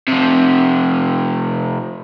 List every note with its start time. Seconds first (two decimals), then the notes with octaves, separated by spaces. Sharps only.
0.08 C3 F3